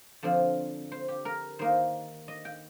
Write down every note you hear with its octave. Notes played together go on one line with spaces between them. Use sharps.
D3 F3 C4
C5
G4
A#4
D#3 A#3 D#4 C5
D#5
G5